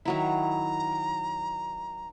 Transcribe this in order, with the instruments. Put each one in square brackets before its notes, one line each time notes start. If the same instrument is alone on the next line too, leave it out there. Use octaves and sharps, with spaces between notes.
[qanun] D#3 F#3 E4 [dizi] A#5